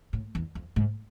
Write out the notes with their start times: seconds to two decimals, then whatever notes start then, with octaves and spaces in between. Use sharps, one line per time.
0.13 A2
0.35 E2
0.55 F2
0.76 G#2